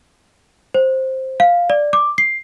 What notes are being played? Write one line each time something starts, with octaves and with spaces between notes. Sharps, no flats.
C5
F5
D5
D6
C7